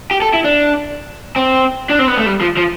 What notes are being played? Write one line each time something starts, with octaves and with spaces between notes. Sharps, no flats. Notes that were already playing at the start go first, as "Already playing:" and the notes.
G4
A4
E4
D4
C4
D4
C4
B3
A3
G3
F3
F3